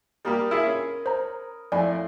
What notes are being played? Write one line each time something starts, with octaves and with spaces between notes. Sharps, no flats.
G3 A#3 G4 A#4 D#5 B5
E4 F4 G#4
C#4
C5 A#5
F2 A2 D5 G#5 B5 C6